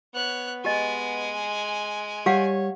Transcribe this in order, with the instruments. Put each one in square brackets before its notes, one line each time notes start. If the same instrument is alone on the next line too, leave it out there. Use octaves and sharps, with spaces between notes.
[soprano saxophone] B3 [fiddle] C#5 F#6
[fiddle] G#3 G#5 [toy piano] G4 D#5
[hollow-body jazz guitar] G3 [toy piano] G4 F5 F#5 [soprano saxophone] C#5